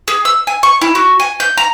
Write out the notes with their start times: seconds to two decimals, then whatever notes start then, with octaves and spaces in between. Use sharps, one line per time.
0.08 G#4
0.25 E6
0.47 G#5
0.63 C#6
0.81 E4
0.95 F#4
1.20 G#5
1.40 G6
1.57 A#5